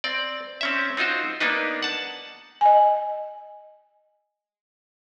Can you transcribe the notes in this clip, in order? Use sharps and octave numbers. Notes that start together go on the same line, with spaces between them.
C4 D5
C4 C#4 E5
C4 D#4 F4 F#4 C5
A#3 B3 D4 D#4 B4
F#5 A5
D#5 G#5